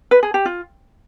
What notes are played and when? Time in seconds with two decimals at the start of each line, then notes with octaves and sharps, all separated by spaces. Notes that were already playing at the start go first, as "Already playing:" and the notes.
0.11 B4
0.23 G#4
0.34 G4
0.45 F4